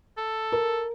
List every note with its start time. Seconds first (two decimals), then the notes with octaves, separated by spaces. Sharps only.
0.18 A4
0.52 A#4